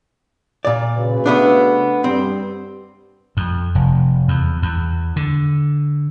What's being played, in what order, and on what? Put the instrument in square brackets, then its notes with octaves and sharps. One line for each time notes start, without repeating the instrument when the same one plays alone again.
[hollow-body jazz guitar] A#2 D5
[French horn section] C#3 F#4 B4
[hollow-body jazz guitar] A3 B3 D4
[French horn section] G2 G3 [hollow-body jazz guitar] C4
[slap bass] F2
F1
E2
E2
D3